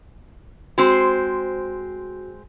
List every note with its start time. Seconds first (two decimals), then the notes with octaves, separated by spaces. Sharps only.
0.78 G#3 C4 F#4 C5